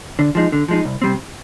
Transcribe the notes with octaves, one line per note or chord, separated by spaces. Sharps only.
D3
F3 G#3 D#4
D3
F3 G#3 D#4
C2
C3 G3 C4